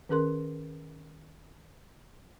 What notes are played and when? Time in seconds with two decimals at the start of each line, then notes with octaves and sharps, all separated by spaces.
0.09 D#3 C#4 G#4 A#4 C6